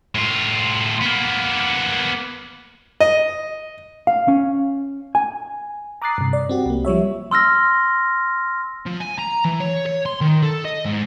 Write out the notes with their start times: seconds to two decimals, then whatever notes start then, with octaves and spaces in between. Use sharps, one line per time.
0.15 A2 F4
1.01 A#3 B3
3.00 D#5
4.07 F5
4.28 C#4
5.15 G#5
6.02 A#5 D6 D#6 F#6 A6 C7
6.18 G2 C3
6.33 D5
6.49 C4 F#4 G4
6.66 C2 A#3
6.85 F3 G3 C#5 E5
7.31 C6 E6 F6 A#6
8.86 F3
9.00 G#5
9.19 A#5
9.45 E3
9.60 C#5
9.86 C#5
10.06 C6
10.21 D#3
10.42 A4
10.65 D#5
10.85 G#2